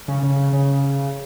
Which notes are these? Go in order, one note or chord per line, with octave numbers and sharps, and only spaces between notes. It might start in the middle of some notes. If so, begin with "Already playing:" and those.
C#3
C#3
C#3